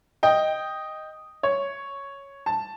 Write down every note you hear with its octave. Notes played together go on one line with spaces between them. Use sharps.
D#5 G5
C#5
A5